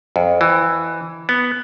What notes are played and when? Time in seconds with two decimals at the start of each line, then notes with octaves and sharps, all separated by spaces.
0.16 F2
0.41 E3
1.29 B3